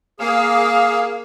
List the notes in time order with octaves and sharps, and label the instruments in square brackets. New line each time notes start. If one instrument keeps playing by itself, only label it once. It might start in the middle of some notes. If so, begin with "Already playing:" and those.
[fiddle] A#3 [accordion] G#4 F5